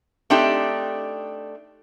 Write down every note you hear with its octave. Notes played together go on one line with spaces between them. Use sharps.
A3 C4 D4 D#4 G4